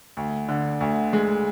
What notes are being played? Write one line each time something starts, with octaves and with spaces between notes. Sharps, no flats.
D2
D3
D2
G#3